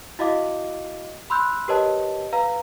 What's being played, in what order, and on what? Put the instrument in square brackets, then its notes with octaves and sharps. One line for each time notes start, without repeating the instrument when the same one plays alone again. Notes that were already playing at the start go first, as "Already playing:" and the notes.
[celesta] E4 F#4 D#5 F5 D6
B5 C6 E6 F#6 G6
G4 A#4 B4 C#5 D#5 A5
B4 F5 A#5